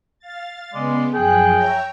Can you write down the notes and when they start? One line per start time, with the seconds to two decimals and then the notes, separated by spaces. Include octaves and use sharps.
0.19 F5 A6
0.73 C#3 G#3 B3 D5 C6
1.14 F#2 F3 G#4 G5 F#6
1.53 C#5 E5 A#5